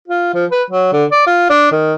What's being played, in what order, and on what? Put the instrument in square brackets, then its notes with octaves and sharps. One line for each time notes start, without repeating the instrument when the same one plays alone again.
[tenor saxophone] F4
F3
B4
F#3
D3
D5
F4
D4
D#3